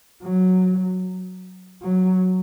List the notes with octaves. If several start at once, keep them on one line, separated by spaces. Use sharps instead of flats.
F#3
F#3